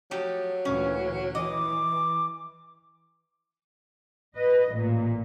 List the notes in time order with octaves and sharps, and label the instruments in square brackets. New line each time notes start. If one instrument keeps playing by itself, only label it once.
[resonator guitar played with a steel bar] F3 A3 G4 [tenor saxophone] F#3
[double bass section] D2 A#2 E3 [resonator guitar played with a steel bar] C#4
[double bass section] E3 [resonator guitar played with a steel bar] D#5 [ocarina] D6
[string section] B4 D#5
A1 A#2